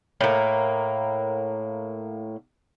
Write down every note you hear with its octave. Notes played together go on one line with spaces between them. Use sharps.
A2 A#3